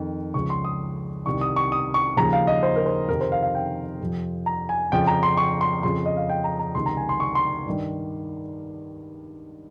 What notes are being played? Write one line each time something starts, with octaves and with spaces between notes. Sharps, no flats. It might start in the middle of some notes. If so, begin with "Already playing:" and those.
Already playing: F2 D#3
C#2 C#3 F3 C#6
C6
D#6
C2 C3 D#3 C#6
D#6
C#6
D#6
C#6
D#2 C#3 F3 A#5
F5
D#5
C5
A#4
C5
F2 C3 D#3 A#4
C5
F5
F5
G5
F2 C3 F3
A#5
G#5
F2 C#3 F3 G5
A#5
C6
C#6
C6
F2 C#3 F3 C6
D#5
F5
G5
A#5
A#5
C#2 C3 D#3 C6
A#5
G#5
C6
C#6
C6
G2 D#3